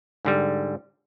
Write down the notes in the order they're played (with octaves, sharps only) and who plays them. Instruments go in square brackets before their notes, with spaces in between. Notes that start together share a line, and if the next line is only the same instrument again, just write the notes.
[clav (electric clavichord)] G#2 D3 G3